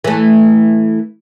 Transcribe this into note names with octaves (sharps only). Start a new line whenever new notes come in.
E3 A3